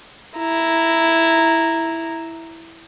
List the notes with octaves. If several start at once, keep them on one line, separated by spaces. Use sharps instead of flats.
E4 A#5